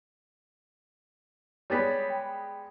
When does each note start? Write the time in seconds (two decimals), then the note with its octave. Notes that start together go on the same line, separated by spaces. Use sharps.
1.70 G3 G#3 B3 C#5 A6 B6
2.10 G5